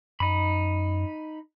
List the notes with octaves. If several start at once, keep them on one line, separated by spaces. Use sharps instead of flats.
F#2 D#4 B5